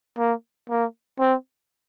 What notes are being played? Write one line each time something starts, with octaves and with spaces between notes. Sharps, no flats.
A#3
A#3
C4